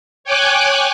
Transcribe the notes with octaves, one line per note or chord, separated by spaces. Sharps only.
C#5 G5 G#5 D6 F#6